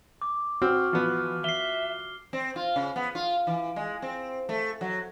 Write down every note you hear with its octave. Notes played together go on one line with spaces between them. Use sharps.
D6
C4 F#4 F6
E3 F3 B3
E5 C7 G7
C4
F4
C#3
B3
F4
E3
G#3
C4
A3
F#3